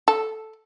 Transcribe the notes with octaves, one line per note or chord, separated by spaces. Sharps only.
A4